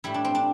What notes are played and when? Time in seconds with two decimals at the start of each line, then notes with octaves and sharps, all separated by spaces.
0.04 A2 G3 E4
0.14 D4
0.25 C4
0.35 D4